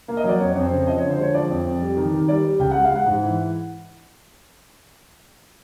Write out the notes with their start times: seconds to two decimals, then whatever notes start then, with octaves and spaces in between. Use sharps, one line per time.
0.08 A#3
0.17 D#5
0.24 F#3 D5
0.39 F2 C#5
0.52 F2 C#5
0.63 C5
0.71 C#3
0.87 F3 D#5
0.98 D3 C#5
1.10 C5
1.18 G#3 C#5
1.33 F3 D5
1.49 F2
1.66 F2
1.81 G3
1.97 D#3
2.13 D#3
2.28 G3 D5
2.44 G3
2.59 C#2 G5
2.71 G#3 F#5
2.84 F5
2.91 G#3 F#5
3.06 G#2
3.22 E3